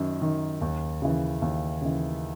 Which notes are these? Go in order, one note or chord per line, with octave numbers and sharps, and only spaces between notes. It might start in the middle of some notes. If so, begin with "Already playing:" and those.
Already playing: F#2 D#3
D#3
D#2
C#3 E3
D#2
C#3 E3